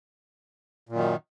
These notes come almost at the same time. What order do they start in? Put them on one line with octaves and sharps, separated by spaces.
A#2 F#2 D#3